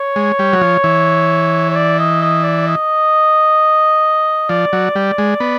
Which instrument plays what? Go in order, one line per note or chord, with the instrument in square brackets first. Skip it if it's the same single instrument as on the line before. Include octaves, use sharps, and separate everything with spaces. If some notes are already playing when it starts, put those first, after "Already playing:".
Already playing: [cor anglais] C#5
[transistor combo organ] G#3
G3
F#3
F3
E3
[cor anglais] C#5
D5
D#5
D#5
D5
D#5
[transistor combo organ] F3 [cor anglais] D5
[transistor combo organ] F#3
G3
G#3
B3